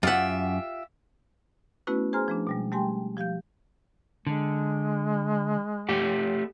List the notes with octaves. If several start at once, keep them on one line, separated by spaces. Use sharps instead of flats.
F#2 F4 G4 E5 F#5
A3 B3 C#4 E4 F#4 B4
G#4 C5 G#5 A#5 C6 F6
F3 A3 D4
B2 G3 G#3
G3 A3 G4 G5 G#5 C6
F3 G4 F5 G6
D3 G#3
A3 G4 F#5